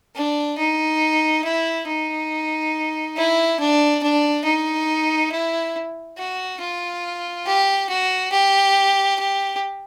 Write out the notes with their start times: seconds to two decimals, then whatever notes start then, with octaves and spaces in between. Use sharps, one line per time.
0.16 D4
0.58 D#4
1.44 E4
1.88 D#4
3.17 E4
3.60 D4
4.03 D4
4.45 D#4
5.32 E4
6.18 F#4
6.61 F4
7.46 G4
7.89 F#4
8.32 G4
9.19 G4